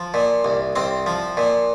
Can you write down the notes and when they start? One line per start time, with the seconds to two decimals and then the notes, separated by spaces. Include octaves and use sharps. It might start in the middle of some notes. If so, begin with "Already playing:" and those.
Already playing: F3
0.14 A#2
0.45 C2
0.76 C2 C4
1.06 F3
1.37 A#2